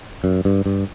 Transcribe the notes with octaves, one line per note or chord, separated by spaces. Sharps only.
F#2
G2
G2